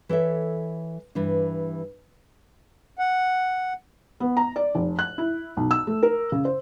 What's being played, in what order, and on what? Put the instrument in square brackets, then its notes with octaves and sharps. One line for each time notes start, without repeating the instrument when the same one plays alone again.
[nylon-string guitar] E3 A4 C#5 E5
G2 E3 D4
[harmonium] F#5
[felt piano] B3
A#5
D5
F1
F#6
E4
B1
E6
A3
A#4
C#3
C5